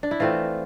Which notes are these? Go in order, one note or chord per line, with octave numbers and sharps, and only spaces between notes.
D4
E4
E3 A3 C4 F4